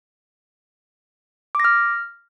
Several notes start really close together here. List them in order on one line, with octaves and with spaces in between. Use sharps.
D6 A#6 F6